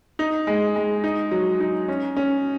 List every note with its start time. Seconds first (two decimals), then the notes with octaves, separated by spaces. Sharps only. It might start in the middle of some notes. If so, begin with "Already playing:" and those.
0.19 D#4
0.47 G#3
0.76 G#3
1.04 D#4
1.31 F#3
1.60 D#4
1.88 C#4
2.17 C#4